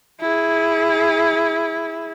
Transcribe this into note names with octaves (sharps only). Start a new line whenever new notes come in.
E4 G#4